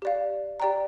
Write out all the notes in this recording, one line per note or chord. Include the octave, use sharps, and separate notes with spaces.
G4 D5 F5
G4 D5 G5 A#5